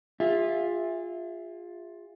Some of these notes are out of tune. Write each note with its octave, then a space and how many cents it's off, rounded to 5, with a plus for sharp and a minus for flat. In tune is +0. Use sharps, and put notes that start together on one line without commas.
F4 +10 G#4 -30 E5 +0